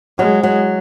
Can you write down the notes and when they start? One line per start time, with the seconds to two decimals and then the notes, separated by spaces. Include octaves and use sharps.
0.19 F#3 G#3
0.43 F#3